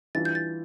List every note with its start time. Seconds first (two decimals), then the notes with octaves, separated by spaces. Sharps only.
0.15 E3 G3 D4 F4 A6
0.25 G6
0.35 A6